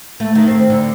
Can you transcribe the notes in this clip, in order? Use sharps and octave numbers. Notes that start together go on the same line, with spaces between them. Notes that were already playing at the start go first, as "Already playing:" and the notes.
A3
D#3
C4
D3